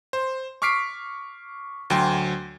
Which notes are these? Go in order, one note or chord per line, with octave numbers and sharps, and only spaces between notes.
C5
C#6 D6 F6 B6 C7 D7
D2 F#3 G5 C6